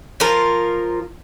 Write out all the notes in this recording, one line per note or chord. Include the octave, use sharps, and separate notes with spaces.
F3 F4 A#4